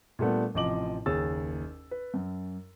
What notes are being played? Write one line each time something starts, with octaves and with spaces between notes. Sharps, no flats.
A#2 G3 A3 B3 D4
A1 C3 F3 D#5 D6 F#7
F#1 D#2 G#4 C#5 E6 A6
B4
F#2